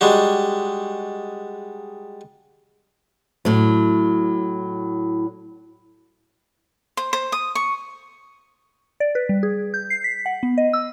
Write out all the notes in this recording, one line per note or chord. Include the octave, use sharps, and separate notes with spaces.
G3 G#3 D4 F#4
A2 F#3
C5
C5
D#6
C#6
D5
B4
G3
G#4
G6
C7
B6
F#5
B3
D#5
E6